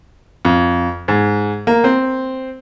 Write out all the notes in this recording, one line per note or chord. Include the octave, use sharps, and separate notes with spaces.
F2
G#2
A#3
C4